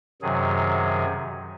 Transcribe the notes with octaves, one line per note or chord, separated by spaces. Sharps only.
F#2 C3 D#3 F#3 G#4